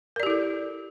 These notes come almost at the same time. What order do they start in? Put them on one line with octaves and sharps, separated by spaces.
A#4 D5 G4 E4 A4